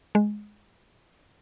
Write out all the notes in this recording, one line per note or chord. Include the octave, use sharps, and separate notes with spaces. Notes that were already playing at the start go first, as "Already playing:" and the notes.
G#3